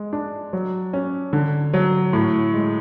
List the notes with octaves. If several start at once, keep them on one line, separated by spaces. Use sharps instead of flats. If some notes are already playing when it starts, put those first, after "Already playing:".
Already playing: G#3
D4
F#3
C#4
D3
F#3
A2
G#3